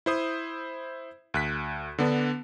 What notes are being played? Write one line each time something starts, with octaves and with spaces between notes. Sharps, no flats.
E4 C5 D#6
D2 F#6 B6
D3 B3 D4